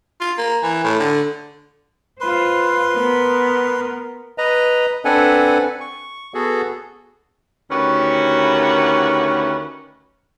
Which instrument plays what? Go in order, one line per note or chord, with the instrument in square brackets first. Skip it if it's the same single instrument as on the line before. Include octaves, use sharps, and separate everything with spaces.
[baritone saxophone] F4
A#3
E3
A2
D3
[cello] F4 C5 [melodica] B4 C6
[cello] B3 A#4
[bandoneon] B4 D#5 A#5
C4 D4 A4 B4 F#5 G#5
C#6
B3 F#4 G#4 A4
[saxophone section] D2 D#3 C#4 F#4 G4 B4